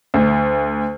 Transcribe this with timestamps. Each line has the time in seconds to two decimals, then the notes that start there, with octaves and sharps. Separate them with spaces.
0.14 D2